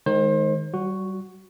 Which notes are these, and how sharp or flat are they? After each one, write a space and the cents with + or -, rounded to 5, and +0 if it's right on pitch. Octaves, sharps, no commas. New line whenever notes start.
D#3 +0 G#3 +5 C5 +35
G3 -30 F#4 +0